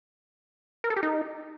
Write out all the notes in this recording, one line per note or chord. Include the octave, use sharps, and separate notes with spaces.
A#4
A4
G4
D#4